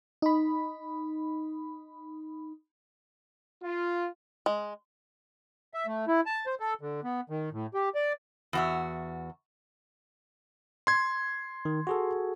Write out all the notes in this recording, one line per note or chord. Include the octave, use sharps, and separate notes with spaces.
D#4 B5
F4
G#3
E5
A3
E4
A5
C5
A4
D3
B3
D#3
A2
G4
D5
E2 F#4 E5
C6 G#6
D#3
F#4 G#4 A4